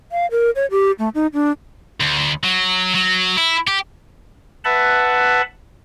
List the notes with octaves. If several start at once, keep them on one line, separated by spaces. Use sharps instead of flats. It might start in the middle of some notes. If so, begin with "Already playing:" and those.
F5
A#4
C#5
G4
A3
D#4
D4
D2
F#3
F#3
E4
G4
B4 E5 F#5 A5 B5